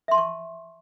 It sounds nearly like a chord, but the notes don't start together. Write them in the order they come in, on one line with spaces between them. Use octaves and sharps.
E5 C6 A5 C#6